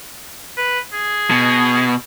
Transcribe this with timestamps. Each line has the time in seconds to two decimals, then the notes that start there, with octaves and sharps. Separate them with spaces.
0.57 B4
0.93 G#4
1.31 B2